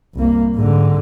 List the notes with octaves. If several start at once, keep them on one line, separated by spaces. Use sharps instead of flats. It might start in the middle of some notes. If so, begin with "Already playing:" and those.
C2 A#3
G#2 D3